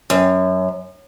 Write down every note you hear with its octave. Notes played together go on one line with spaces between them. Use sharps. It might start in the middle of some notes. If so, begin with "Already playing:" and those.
F#2